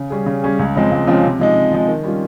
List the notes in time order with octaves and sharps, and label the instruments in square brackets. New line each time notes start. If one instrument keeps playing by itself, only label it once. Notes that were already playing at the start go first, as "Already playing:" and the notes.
Already playing: [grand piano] C#3
G3 C#4 G#4
C#3
G3 C#4 G#4
C#2
C#3 F3 G#3 C4
C#2
C#3 F3 G#3 C4
C3
F3 G#3 D#4
C3
F3 G#3 D#4
D#3
G3 C#4 F4